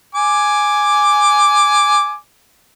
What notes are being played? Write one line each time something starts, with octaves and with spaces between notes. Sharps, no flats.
G#5 D6